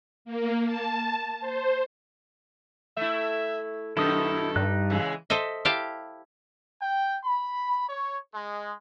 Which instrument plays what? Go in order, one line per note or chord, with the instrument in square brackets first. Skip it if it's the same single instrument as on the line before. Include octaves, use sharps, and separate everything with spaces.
[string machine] A#3
A5
C5
[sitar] A3 E4 [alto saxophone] E5
[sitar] F#2 B2 D#3 [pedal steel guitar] E4 D#6 [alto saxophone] A4
[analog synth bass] G2 [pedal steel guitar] G3 D#4 F#6
[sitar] C#3 E3 G#3
[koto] A4 C5 D#5 E5
E4 G4 F5 G5 A5
[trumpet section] G5
B5
C#5
G#3